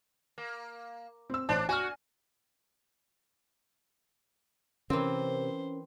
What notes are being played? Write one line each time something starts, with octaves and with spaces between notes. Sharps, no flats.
A#3
C4 E6
A1 D4 C5 A5
F#4 G#5 F6
C3 E3 C4 C#4 A#4 C5